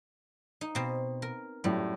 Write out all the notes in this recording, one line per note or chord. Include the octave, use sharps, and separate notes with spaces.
D#4
B2 C4
A#4
F#2 A2 G3